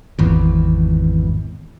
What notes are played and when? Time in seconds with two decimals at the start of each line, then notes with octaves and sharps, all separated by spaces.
0.19 G#1 E2